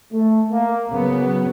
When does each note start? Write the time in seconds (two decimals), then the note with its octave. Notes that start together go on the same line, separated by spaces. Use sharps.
0.13 A3
0.52 A#3
0.92 C#3 F#3 B3